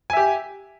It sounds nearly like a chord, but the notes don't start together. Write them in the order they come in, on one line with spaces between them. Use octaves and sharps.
G#5 E5 G4